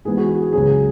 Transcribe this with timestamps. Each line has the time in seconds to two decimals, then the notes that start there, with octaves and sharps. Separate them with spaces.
0.05 G#2 E3 G#3 B3 G#4
0.17 F#4
0.29 F#4
0.41 G#4
0.53 C#2 C#3 F#3 G#4